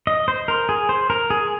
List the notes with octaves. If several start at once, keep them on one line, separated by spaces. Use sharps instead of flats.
D#5
C5
A#4
G#4
C5
A#4
G#4